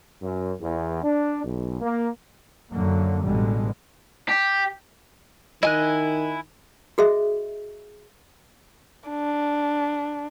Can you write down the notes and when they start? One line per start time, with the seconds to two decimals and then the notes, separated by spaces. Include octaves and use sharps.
0.22 F#2
0.61 E2
1.03 D4
1.44 B1
1.81 A#3
2.73 F#2 D3 F#3 A#3
3.25 A1 B2 D3 G3 G#3
4.29 G4
5.63 D#3 E4 D#5 G#5 F#6
6.98 F#4 G#4 D#5 E5
9.09 D4